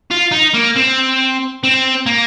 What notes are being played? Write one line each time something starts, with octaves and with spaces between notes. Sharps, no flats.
F4
D#4
A#3
C4
C4
A#3